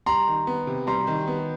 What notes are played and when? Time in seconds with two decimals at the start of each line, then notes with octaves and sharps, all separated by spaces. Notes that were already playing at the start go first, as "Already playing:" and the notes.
0.06 G3 A#5 C6
0.27 D#3
0.47 B3
0.67 C3
0.87 G3 A#5 C6
1.07 D#3
1.27 B3